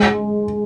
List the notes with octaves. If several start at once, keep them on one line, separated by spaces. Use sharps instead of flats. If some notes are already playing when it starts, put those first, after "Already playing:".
Already playing: G#3